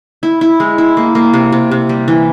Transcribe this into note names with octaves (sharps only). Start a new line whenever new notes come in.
E4
E4
G#3
E4
A#3
A#3
C3
C3
C3
G3
E3